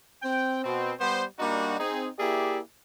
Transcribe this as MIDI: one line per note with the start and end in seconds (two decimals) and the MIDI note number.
0.23 0.63 60
0.23 0.63 79
0.64 0.92 47
0.64 0.92 60
0.99 1.24 55
0.99 1.24 59
0.99 1.24 72
1.39 1.75 55
1.39 1.75 58
1.39 1.75 62
1.39 1.75 63
1.39 1.75 66
1.79 2.07 60
1.79 2.07 63
1.79 2.07 68
2.19 2.59 58
2.19 2.59 64
2.19 2.59 67
2.19 2.59 68
2.19 2.59 74
2.19 2.59 76